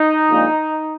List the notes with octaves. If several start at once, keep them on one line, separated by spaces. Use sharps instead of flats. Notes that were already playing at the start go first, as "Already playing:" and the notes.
Already playing: D#4
A#1 A#2 G#3